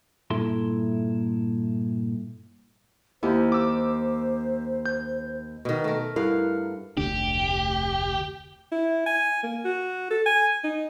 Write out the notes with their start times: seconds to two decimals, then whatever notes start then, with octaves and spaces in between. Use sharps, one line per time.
0.30 G2 A#2 E4 A4 E5 C6
3.23 D#2 E4 G4 C5
3.52 D6 E6
4.86 G6
5.65 B2 D#3
5.84 A3 A#4
6.16 G2 E4 A#4 F5 F#5
6.97 F1 D2 D4 G4
8.72 E4
9.06 G#5
9.43 A#3
9.64 F#4
10.10 A4
10.26 G#5
10.64 D#4